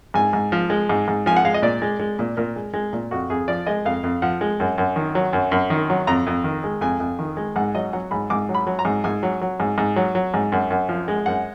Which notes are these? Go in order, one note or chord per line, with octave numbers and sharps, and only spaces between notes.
G#2 G#5
G#2
F3
G#3
G#2
G#2
F3 G#5
F#5
G#3 F5
D#5
A#2 D5
G#3
G#3
A#2
A#2 A#4
G#3
G#3
A#2
F2 F#4
F2 G#4
F3 D5
G#3 D#5
F2 F5
F2
F3 F#5
G#3
F#2
F#2
D#3
F#3
F#2
F#2
D#3
F#3
F2 A#5
F2
D#3
G#3
F2 G#5
F2
D#3
G#3
G#2 F#5
F#3 D#5
F#3 F#5
G#2 B5
G#2 D6
F#3
B5
F#3
A#5
G#2
G#2 G#5
F#3
F#3
G#2
G#2
F#3
F#3
G#2
F#2
F#2
F3
G#3
F#2 F#5